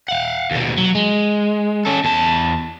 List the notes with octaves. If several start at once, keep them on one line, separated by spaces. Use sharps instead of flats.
F5 F#5
D#2 B2
F#3
G#3
C#4 A4
E2 A5